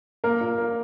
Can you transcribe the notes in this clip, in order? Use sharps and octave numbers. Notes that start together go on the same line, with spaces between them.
A#3 A#4
A#2
A#3